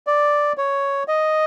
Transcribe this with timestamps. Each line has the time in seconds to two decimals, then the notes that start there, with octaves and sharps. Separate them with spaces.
0.07 D5
0.58 C#5
1.08 D#5